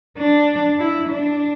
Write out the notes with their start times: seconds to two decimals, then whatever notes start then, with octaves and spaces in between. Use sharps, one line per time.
0.18 D4
0.79 E4
1.09 D4